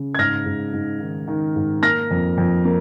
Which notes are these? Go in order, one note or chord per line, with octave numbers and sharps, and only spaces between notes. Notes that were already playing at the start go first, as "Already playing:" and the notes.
Already playing: C#3
G#6
G#2 F6 A#6
G#2
G#2
D#3
D#3
G#2
A#3 F6 A#6
F2
F2
A#3